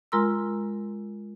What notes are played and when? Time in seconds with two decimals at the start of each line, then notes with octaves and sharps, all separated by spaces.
0.12 G#3 F4 A#4 A#5 C6 E6